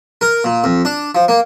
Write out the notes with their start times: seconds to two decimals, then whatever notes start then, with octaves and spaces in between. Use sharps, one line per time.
0.21 A#4
0.44 A#2
0.64 F2
0.85 D4
1.15 F3
1.28 A#3